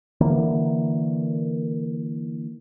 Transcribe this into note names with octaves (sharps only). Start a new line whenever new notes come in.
D3 E3 A#3